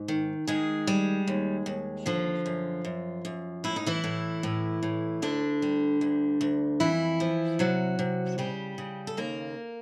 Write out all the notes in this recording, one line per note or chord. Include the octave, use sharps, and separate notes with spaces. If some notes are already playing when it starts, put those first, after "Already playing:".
Already playing: G#2
D#3
D#3 G#3 G#4
G3
D#2
D#2
D3 F3 F4
F#2
F#2
F#2
A2 E4
D#4
E3 E4
A2
A2
A2
D2 D3 D4
G3
D2
D2
F2 E3 E4
F3
C3 F#3 F#4
C3
C#3 G3 G4
C#3
A4
D#2 A#3 A#4